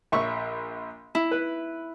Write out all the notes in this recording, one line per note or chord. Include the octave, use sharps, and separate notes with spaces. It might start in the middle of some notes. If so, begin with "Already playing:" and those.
A#1 E5 C#6
E4
B4